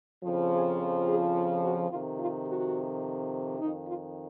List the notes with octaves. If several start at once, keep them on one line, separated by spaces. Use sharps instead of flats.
F2 C#3 F3
G#4
G#4
F#4
F2 C3 D#3 F4
F4
F#4
F2 D#3 D#4
F4